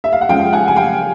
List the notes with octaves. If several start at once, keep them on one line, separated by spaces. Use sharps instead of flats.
E5
F5
F#5
F3 G#3 C#4 F5 G5
F#5 G#5
G#5
F5 G5